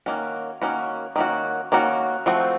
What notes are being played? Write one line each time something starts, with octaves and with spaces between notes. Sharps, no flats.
D#3 A#3 C#4 F#4
D#3 A#3 C#4 F#4
D#3 A#3 C#4 F#4
D#3 A#3 C#4 F#4
F3 A3 C4 F#4